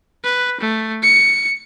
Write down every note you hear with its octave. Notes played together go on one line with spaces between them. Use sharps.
B4
A3
C#7